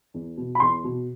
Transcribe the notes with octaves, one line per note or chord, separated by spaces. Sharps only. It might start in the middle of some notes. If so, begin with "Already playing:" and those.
E2
B2
B5
E2 C6
B2